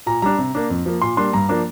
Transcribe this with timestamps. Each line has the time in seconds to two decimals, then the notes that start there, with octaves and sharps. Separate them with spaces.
0.06 A#2 A#5
0.22 G3 D4 A#5
0.38 C3
0.55 A#3 D4
0.70 F2
0.86 F3 A#3
1.01 A#2 C6
1.17 G3 A#3 D4 C6
1.33 G2 A#5
1.49 F3 A#3 D4 A#5